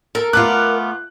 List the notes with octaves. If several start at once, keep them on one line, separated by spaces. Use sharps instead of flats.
A4 A#4
A3 B3 F4 D6 F#6